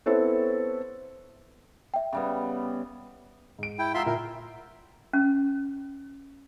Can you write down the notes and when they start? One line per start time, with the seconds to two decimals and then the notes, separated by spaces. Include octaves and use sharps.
0.06 B3 C4 E4 A4 C#5
1.94 E5 G5
2.13 C#3 G3 B3
3.59 G#2 D7
3.79 E4 G5
3.94 F4 E5 F#5 A#5 C6 E6
4.06 A#2 A#4 E5
5.13 C#4